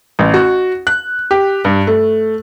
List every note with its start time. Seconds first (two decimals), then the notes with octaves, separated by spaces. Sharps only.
0.19 A1
0.34 F#4
0.87 F#6
1.31 G4
1.65 G2
1.87 A3